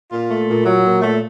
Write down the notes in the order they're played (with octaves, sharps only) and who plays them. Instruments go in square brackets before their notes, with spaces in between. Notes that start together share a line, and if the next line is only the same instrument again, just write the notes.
[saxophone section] A#2 F4
A3
A#2
F#3
A#2
A3